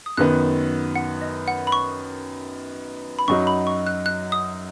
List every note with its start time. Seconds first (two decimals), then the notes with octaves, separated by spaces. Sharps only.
0.06 D#6
0.17 F#2 D#3 B3 F#6
0.95 F#5
1.21 D#5
1.48 F#5
1.67 B5
1.72 C#6
3.19 B5
3.28 F#2 F#3 D#4 C#6
3.47 B5
3.67 C#6
3.87 F#6
4.06 F#6
4.32 D#6